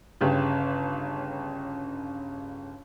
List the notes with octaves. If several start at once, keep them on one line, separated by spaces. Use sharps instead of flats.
G1 C#3 G4